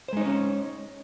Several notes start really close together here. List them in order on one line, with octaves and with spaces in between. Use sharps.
C5 G#3 D#4 C#5 C#4